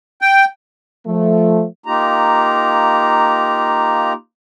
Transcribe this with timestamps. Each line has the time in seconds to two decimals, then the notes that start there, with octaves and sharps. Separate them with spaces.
0.21 G5
1.07 F3 A3
1.86 A#3 D#4 F4 G4 A#5